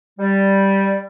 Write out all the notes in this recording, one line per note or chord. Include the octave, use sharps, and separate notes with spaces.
G3